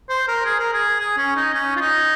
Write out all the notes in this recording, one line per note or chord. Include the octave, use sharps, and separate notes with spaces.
C5
A#4
G#4
A#4
G#4
G#4
C#4
D#4
C#4
F4
D#4